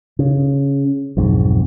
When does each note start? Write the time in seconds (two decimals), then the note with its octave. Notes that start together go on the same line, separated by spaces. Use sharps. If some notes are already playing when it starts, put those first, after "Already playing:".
0.19 C#3
1.17 B1 F2 G#2